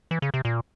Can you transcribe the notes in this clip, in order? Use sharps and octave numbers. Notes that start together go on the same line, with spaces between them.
E3
C#3
C3
A#2